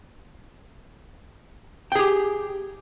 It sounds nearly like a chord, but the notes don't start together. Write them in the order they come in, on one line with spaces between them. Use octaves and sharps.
G5 G#4 G4